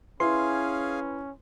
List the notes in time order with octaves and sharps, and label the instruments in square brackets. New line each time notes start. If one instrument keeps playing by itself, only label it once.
[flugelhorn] C#4 [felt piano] E4 B4 [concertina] G#4 F5 G#5 [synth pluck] C6